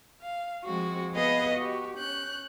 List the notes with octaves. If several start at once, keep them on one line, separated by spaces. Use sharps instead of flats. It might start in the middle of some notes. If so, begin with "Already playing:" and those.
F5
F3 G#3 C4 F#4
B3 G#4 B4 D#5 F5 F#5
F#4 G4
C#4 F#6 G6